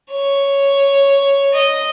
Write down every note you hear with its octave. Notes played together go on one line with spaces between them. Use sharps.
C#5
D#5